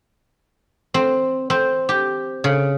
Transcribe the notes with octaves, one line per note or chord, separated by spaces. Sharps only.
C4
C4
G4
C#3